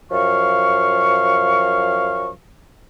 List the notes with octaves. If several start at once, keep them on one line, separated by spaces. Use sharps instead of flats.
F#2 F3 F5 C#6